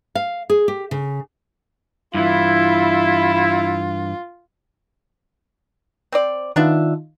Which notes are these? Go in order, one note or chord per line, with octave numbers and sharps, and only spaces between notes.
F5
G#4
G4
C#3
G2 E3 E4 F4
C4 C5 D5
D#3 B3 D4 D#4 F4 E5